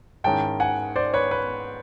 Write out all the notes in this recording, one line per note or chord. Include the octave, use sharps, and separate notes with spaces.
G#2 D#3 G#3 C#4 E4 G5 A5
F#5 G#5
C5 D5
B4 C#5
B4